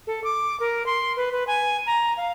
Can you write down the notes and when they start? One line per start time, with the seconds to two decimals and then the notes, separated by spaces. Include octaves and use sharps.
0.07 A4
0.24 D6
0.60 A#4
0.86 C6
1.17 B4
1.32 B4
1.47 G#5
1.87 A#5
2.17 F5